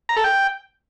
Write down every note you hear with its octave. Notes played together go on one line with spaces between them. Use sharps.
A#5
A4
G5